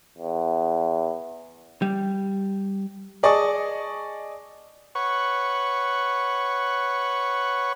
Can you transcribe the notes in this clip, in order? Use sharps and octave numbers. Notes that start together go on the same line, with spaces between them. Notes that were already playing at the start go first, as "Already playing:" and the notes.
E2
G3
G#4 D5 D#5 A5 C#6 D#6
B4 C#5 F#5 C#6